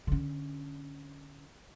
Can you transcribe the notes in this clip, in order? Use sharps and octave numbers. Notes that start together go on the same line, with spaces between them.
D3 C#4